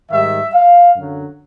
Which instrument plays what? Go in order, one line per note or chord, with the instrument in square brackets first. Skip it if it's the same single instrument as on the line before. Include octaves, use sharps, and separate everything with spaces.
[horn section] G#2 D#3 G3 E5
F5
F#2 D3 F#3